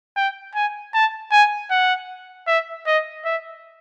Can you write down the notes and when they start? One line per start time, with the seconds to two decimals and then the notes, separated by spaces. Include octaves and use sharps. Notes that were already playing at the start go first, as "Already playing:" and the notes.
0.17 G5
0.55 G#5
0.94 A5
1.32 G#5
1.70 F#5
2.47 E5
2.86 D#5
3.25 E5